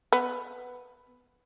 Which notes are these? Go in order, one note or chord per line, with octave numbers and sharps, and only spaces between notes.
B3